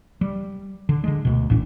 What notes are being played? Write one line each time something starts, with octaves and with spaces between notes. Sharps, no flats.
G3
D3
D3 G#3
D2 B2
A1 A#2 D4